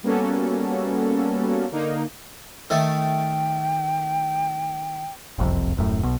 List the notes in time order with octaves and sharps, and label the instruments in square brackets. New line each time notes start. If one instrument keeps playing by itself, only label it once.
[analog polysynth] G3 A#3 B3 C#4 F#4 A4
D3 A#3 D#4
[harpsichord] D#3 A3 [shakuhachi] G5
[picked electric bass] F#1 C2 F2 C3
D#1 F#2 A2
B1 B2